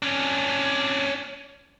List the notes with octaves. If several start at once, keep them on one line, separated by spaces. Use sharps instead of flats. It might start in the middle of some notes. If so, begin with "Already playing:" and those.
C#4 D4